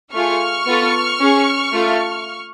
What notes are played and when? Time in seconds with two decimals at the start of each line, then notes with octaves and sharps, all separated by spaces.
0.13 A3 F4 G#4 C#6 F6
0.66 B3 F4 A4
1.20 C#4 G#4
1.72 A3 F4 A4